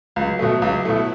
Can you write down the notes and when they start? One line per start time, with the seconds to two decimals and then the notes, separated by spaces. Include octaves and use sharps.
0.15 C#2 F#3
0.39 B2 A3
0.62 C#2 E4
0.85 B2 A3